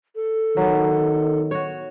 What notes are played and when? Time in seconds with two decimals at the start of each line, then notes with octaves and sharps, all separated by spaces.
0.15 A4
0.57 D#3 F#3 B3
1.51 F#4 C#5